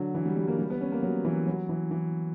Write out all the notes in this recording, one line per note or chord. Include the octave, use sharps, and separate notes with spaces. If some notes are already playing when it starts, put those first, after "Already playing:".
Already playing: D3 F#3
E3
G3
G3
A#3
G3
B3
C#4
A#3
F#3
E3
F#3
E3
E3